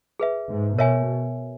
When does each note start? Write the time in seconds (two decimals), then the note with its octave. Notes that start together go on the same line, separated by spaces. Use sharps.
0.20 G#4 B4 E5
0.50 G#2
0.78 B2 A#4 C#5 E5 G#5